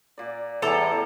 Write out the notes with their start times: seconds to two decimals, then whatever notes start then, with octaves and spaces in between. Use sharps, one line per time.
0.18 A#2 D5
0.62 E2 A2 E3 G3 A4 A5 A#5